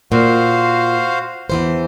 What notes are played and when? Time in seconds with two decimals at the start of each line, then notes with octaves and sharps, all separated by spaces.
0.12 A#2 F#4 C5 F5
1.50 E2 E3 C5